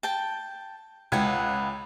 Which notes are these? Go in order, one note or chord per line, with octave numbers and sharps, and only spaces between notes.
G5 A5
C#2 B4 F#5 G5 G#6